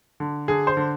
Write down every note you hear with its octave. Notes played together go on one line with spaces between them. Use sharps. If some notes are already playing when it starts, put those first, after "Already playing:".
D3
D3 G#4
C5
D3